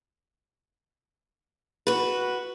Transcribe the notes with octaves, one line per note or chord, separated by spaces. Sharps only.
F#4 B4